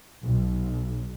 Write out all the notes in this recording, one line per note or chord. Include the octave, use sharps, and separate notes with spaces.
B1